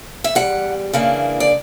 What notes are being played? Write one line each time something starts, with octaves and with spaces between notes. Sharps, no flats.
E5
E2 C#3 G3 F#5
C#3 E3 A#3 D4
D5